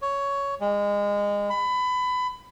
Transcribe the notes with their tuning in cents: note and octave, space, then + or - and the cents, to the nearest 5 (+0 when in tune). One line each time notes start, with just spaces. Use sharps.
C#5 +10
G#3 -25
B5 +25